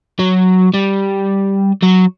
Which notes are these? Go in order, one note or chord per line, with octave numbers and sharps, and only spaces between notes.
F#3
G3
F#3